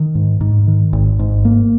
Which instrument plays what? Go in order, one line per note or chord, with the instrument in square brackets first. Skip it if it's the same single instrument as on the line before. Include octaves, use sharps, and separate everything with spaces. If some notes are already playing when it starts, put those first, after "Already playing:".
Already playing: [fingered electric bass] D#3
G#2
G#2
D#3
G#1
G#2
A#3